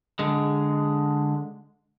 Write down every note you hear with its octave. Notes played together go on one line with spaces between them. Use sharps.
D3 G#3